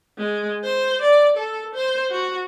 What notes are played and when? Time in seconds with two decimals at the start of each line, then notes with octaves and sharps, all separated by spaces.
0.18 G#3
0.64 C5
1.02 D5
1.37 A4
1.75 C5
2.11 F#4